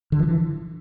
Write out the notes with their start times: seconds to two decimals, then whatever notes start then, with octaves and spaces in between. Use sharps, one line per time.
0.12 D3
0.19 F3
0.28 E3